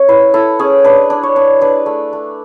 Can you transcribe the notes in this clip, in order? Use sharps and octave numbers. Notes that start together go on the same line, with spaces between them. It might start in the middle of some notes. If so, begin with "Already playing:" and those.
Already playing: C#4 C#5
E4 B4
E4 A4
C#4 G#4
D4 B4
D4
C#5
D4
D4 B4
A3
A3